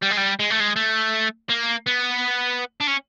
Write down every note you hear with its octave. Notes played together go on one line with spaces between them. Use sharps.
G3
G#3
G3
G#3
A3
G#3
A3
A#3
B3
D4
C#4